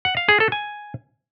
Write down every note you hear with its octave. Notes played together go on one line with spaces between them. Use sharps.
F#5
F5
G#4
A4
G#5